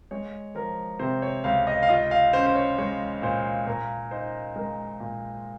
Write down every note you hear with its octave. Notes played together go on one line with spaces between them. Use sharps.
G#3 C#5
F3 A#4
C3 C5
C#5
C#2 F5
D#5
F5
F4 D#5
F5
C#4 C5
C5
C#5
G#3 C#5
A#2 C5
A#2 A#4
D#4 C5
G#3 A#4
A#2